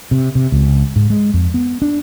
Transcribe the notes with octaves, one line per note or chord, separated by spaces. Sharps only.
C3
C3
C#2
G#2
G#3
F2
B3
D4